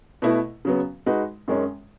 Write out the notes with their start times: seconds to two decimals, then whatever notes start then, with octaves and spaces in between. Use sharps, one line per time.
0.22 B2 A3 E4 B4
0.65 C#3 F#3 B3
1.06 G#3 D#4 F#4 B4
1.48 F#2 D#3 G#3 C#4